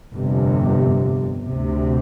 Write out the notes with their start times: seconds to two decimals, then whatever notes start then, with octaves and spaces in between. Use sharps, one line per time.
0.12 G1 F2 C3
1.44 D2 C3